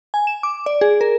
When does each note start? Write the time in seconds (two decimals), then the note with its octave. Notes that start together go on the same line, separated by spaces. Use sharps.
0.14 G#5
0.27 E7
0.43 D6
0.66 D5
0.81 G#4
1.01 A#4